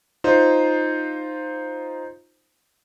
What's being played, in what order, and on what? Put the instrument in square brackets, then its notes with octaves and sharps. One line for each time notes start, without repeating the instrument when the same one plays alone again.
[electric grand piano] D#4 F4 C5